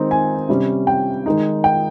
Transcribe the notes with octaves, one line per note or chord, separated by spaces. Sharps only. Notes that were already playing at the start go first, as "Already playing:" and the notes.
Already playing: D#3 G#3 C4 D#4
G#5
C3 G3 C#4
G5
D#3 G#3 D#4
G5